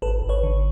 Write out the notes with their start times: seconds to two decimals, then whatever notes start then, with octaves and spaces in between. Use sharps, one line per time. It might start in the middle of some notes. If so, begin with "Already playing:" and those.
0.02 G#1 A4 B4
0.22 G#1
0.29 B4 C#5
0.43 D3